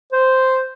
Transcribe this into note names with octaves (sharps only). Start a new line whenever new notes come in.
C5